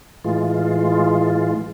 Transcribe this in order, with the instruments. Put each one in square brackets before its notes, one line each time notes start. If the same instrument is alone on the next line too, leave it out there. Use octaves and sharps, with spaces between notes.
[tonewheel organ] A2 E3 G#3 F4